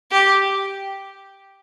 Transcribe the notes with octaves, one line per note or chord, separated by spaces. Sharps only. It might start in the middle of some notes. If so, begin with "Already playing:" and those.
G4